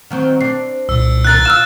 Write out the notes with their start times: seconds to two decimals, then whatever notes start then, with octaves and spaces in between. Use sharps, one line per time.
0.10 D#3 F#3 C4
0.41 C4 D4 C7
0.89 C2 A#2 E6
1.25 D#3 D4 A#4 F#6 A6
1.45 F4 E6 F6 E7